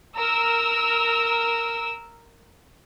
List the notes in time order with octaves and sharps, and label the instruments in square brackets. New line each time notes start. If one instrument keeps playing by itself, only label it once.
[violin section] A#4 E6